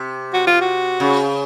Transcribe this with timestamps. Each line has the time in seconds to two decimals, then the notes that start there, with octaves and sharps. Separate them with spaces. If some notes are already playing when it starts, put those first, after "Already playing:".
Already playing: C3
0.34 F#4
0.47 F4
0.61 F#4
1.00 C#3